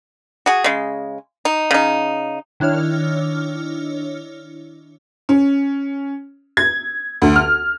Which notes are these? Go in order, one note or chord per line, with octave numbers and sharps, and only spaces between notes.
F#4 G#4
C#3 G#3
D#4
C#3 D#4
D#3 D4 E4 C#5 F6
C#4
G#6
D2
F6